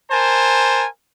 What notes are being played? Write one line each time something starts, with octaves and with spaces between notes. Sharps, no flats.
A#4 C5 G#5 A5